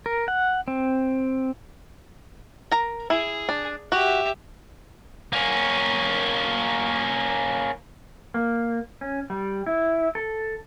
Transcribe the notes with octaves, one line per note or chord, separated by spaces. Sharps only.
A#4
F#5
C4
A#4 A#5
E4 G#4
D4
F#4 G4 E5
A#3 C#4
A#3
C#4
G3
E4
A4